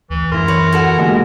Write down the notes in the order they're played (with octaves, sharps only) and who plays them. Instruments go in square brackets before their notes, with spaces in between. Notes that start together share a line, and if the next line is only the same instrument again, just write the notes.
[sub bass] D2 [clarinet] E3
[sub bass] F#2 [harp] E3 E4 C6 [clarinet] A#4
[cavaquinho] B4 C#5
F#4 A4 G#5
[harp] D#2 G#2 B2 [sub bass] D3